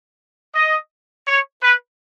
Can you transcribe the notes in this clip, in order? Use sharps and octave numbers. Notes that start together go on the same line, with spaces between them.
D#5
C#5
B4